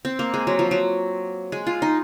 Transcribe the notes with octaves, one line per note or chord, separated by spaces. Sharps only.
C4
A#3
G#3
F#3
F3
F#3
G#3
F4
D#4